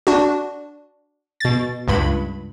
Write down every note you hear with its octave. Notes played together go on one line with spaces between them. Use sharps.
D4 F#4
B2 A6
C#2 G2 B5